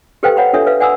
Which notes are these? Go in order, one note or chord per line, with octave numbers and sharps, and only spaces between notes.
G4 A4 B4 C5 F5 G5
C#5 F#5 A#5 B5
D4 F4 A4 C#5 E5
B4 E5 F5
D5 F#5 G#5 B5 D#6 E6